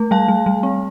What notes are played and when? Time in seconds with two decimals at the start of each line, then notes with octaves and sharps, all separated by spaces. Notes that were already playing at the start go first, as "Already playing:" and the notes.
Already playing: A3
0.11 G3 F5 A5
0.28 G3
0.46 G3
0.63 C4